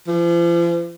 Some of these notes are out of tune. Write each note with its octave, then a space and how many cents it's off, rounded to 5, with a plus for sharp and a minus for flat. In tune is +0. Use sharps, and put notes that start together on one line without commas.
F3 -40